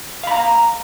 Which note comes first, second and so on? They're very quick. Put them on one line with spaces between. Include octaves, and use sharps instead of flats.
F5 B5 A#5